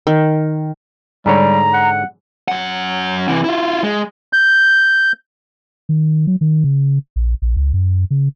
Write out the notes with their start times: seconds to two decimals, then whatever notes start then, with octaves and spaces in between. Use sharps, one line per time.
0.07 D#3
1.26 G#2 D3 G3 C#5 A#5
1.74 F#5
2.48 F#2 F#5
3.28 C3 E3
3.44 E4 F4
3.84 G#3
4.33 G6
5.89 D#3
6.27 F#3
6.41 D#3
6.64 C#3
7.16 A#1
7.42 A#1
7.57 C#2
7.74 F#2
8.11 C#3